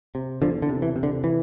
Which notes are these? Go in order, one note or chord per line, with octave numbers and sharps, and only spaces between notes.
C3
E2 D3 F3
D3
C3
E3
C3
D3
E3